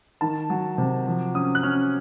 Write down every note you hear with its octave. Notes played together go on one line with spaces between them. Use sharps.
D#3 A5
F#3
C3
F3
C#4 D#6
F#6
C#4 F6